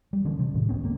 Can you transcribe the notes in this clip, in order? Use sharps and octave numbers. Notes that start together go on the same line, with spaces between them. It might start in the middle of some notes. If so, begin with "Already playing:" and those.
G3
D3 E3 C#4
C3
A2 D#3
F1 A2 B3 C#4
G#2 A#3